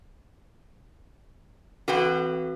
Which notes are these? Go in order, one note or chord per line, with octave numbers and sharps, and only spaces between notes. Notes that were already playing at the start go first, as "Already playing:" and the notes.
E3 C4 F#4 A4 B4 G5